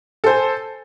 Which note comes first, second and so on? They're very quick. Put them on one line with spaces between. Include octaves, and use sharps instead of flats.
A4 C5 G#5